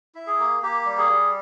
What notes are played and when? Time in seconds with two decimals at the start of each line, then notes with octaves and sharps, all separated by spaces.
0.15 E4
0.27 G#4
0.39 A#3
0.62 A#3 G4
0.86 G3
0.98 G#4
1.10 G3